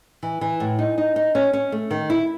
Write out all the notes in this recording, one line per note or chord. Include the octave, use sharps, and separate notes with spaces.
E3
E3
A2
D#4
D#4
D#4
C#4
C#4
A3
D#3
E4